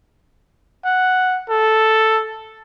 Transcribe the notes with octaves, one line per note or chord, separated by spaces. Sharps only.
F#5
A4